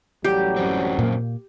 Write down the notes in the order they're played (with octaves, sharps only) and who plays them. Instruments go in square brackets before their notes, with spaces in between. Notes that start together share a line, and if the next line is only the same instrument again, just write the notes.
[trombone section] A1 F#3 G3 [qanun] G4
[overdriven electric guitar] F#2 C4
[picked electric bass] A#2 A#3